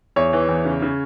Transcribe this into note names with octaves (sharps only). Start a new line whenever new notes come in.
E2 C#5
E3
E2
C#3
C#3